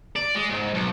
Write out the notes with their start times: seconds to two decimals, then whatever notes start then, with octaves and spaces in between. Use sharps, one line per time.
0.16 D5
0.35 G#3
0.49 G#2
0.74 B1